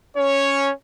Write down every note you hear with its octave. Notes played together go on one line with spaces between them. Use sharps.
C#4 C#5